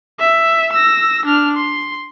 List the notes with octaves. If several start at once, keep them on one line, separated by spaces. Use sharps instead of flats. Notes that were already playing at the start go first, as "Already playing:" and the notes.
E5
E6 A#6
D4 F6
C6